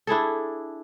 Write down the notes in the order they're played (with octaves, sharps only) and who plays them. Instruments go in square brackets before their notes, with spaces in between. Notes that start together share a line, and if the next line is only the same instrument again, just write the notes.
[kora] D4 E4 G#4 A4